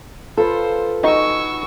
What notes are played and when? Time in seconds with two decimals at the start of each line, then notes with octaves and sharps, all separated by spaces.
0.37 F4 A4 B4 C5
1.04 D#4 F#4 G#5 C#6 E6